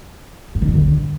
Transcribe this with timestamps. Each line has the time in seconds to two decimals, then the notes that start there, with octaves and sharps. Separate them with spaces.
0.55 G2
0.62 D#3
0.68 B2
0.75 D3